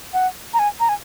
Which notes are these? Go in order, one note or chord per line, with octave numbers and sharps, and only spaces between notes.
F#5
A#5
G#5
A#5
G#5